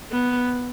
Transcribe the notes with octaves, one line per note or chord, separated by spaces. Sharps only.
B3